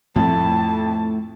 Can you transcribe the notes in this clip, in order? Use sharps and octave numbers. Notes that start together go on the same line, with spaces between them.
F2 A2 A3 A5